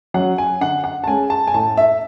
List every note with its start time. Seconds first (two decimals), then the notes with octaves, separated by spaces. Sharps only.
0.14 F#3 C#4 F#5
0.38 G#5
0.61 D3 F#5
0.84 F#5
1.04 A5
1.08 G#3 C#4 G#5
1.30 A5
1.47 G#5
1.54 A2 A5
1.77 E5